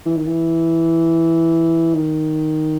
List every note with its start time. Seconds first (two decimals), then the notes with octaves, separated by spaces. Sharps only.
0.06 E3
0.17 D#3
0.27 E3
1.95 D#3